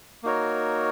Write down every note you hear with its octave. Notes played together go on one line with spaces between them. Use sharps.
A#3 D#4 F#4 A#4 C#5